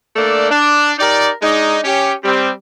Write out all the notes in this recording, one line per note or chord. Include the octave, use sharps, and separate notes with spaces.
A3 A#3 D4 A4 D5
D4
D#4 G4 A#4 D5
G#3 D4 D#4
C#4 G4
G3 C4